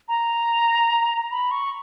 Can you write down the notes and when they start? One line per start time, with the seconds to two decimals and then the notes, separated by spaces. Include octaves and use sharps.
0.08 A#5
1.31 B5
1.51 C#6